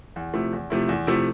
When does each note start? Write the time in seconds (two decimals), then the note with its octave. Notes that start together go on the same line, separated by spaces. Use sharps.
0.16 E2
0.34 C3 F3 A3 E4
0.53 E2
0.70 C3 F3 A3 E4
0.89 E2
1.07 C3 F3 A3 E4